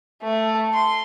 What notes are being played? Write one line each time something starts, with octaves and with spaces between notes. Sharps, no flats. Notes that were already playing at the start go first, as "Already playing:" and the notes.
A3
C6